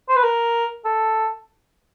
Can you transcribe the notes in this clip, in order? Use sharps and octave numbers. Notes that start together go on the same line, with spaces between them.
C5
B4
A#4
A4